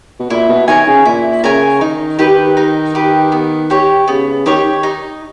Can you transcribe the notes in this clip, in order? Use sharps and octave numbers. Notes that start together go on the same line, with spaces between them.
B2
A#2 E4
B2
D#3 A#4 C#5 G#5
C#3
A#2 E4
C#3 A#4 C#5 G#5
D#3 D#4
D#3 G4 B4
D#4
G4 B4
B3
G4 C#5
C#3 B3
C#3
D#3 G4 C#5
D#4